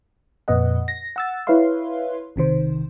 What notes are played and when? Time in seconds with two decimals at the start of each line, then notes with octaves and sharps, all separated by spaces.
0.48 F2 A#2 B4 D#5 F#5
0.88 A#6
1.16 F#5 E6 A6
1.47 E4 B4 C#5 E5 F5 C6
2.36 B1 C3 D#3 C5